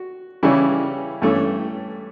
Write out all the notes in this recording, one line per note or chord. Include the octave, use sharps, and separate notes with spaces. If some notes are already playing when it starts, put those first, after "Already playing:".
Already playing: F#4
C#3 E3 G3 C#4 E4
G2 E3 A3 C#4